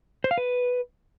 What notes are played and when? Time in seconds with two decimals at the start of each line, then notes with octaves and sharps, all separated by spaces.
0.24 C5
0.31 F5
0.38 B4